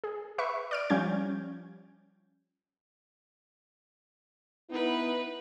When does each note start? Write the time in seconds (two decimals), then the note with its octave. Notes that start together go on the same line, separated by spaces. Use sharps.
0.04 G#4
0.38 B4 E5 C#6
0.71 D5 F6 D7
0.90 F3 G3 C#4 G6 G#6
4.70 B3 D#4 E4 B4